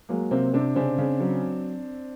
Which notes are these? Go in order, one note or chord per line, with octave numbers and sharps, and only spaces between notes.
F#3 G#3 A#3
C3 A#3 C4
C3 C4 D4
C#3 C4 D4
C#3
F#3